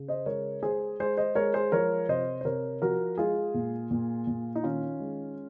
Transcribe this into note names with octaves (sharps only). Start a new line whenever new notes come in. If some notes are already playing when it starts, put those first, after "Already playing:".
Already playing: C#3
C5 D#5
G#3 A#4 C#5
G#3 G#4 C5
G#3 G#4 C5
C5 D#5
G#3 A#4 C#5
G#4 C5
F3 A#4 C#5
C3 C5 D#5
C5
C3 A#4 C#5
F3 F#4 A#4
G#3 F4 G#4
A#2
A#2
A#2
D#4
D#3 C#4 F4
G#3